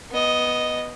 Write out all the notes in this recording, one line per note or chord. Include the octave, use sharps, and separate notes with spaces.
B3 D#5